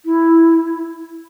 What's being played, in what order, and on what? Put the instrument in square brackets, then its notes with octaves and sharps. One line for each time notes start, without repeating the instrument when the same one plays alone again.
[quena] E4